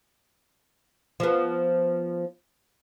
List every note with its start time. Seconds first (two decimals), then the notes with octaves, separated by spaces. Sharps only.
1.20 F3 B3